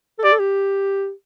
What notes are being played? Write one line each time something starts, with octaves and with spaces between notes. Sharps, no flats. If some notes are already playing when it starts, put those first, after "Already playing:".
A4
G4 D5
A4
G4